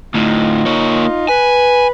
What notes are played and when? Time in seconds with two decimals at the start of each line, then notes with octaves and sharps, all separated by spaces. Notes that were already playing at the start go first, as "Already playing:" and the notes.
0.14 D2 A2 D#4 F4
0.66 A#3 C#5
1.29 B4 G#5